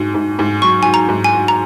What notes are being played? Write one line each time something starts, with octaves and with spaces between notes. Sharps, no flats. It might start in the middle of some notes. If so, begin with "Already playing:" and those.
Already playing: G#2 F#4
G#2
G#2
F#3 C#6
F#4 G#5
A#5
G#2
G#5
F#4
A#5